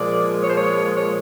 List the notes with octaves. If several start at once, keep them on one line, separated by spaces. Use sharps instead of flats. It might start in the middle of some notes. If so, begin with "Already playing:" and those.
Already playing: A#2 F3 G#3 D5
C#5
C5
C#5
C#5